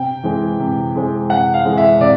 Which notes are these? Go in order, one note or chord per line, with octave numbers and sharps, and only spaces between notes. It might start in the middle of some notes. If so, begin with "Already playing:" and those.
Already playing: C3 G5
E3 G#3 C4
C3
E3 G#3 C4
C3 F#5
F5
E3 G#3 C4
E5
C3 D5